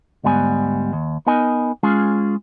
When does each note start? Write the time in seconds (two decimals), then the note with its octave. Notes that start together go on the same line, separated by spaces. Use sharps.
0.24 D2 G#2 G3 B3 G#5
0.93 D#2
1.27 B3 D#4 A#4 D#5 G#5
1.83 G#3 C#4 F4 G#4